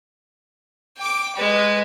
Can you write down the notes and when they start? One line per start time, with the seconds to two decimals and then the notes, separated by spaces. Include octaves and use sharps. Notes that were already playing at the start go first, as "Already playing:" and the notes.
0.97 G5 D6
1.36 G#3 B4